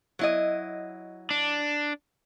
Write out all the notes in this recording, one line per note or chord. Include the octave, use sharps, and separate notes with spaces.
F#3 E4 D#5
D4